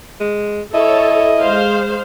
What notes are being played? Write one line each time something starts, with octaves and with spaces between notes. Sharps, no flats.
G#3
E4 A4 C#5 D#5
G#3 C5 F5